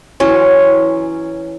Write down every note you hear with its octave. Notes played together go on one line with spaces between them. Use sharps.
E3 F#3 C#4 C6